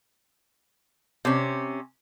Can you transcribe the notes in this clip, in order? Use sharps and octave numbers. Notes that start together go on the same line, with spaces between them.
C3 C#4